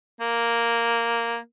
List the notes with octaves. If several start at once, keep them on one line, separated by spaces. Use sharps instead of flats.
A#3